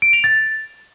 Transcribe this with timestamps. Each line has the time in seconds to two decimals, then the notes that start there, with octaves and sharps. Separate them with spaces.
0.02 D7
0.13 F7
0.24 A6